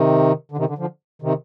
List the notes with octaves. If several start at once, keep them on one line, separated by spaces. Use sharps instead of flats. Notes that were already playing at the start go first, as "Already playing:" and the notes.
Already playing: C3 D#3
D3
C3 D#3
D3
D3 F3
C3 D#3